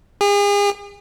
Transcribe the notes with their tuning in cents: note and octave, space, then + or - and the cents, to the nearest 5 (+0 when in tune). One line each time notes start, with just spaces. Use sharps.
G#4 -40